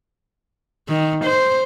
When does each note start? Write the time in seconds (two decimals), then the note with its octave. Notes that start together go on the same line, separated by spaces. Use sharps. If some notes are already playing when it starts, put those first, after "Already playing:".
0.89 D#3
1.25 C5